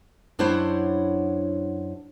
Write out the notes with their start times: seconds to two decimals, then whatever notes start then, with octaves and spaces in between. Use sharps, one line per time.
0.39 F#2 D4 E4 C5 C#5 F#5